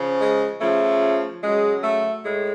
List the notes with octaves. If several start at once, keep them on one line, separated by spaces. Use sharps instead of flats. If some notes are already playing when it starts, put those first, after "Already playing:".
Already playing: C#3 F3
G#3
C#3 F3 A3
C#3 F#3 G#3
A3
A2 G#3